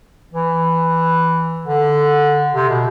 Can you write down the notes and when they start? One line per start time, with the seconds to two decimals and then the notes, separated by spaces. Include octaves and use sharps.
0.34 E3
1.66 D3
2.54 C3
2.69 B2